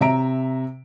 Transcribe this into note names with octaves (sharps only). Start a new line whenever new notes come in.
C3 E5 A#5 D7